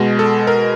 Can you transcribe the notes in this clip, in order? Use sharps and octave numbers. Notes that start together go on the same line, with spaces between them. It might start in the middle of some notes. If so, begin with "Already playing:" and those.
Already playing: B2 G#3
A4
A#4